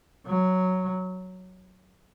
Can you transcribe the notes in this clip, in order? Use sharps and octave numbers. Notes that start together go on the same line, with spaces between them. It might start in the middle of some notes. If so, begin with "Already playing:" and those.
F#3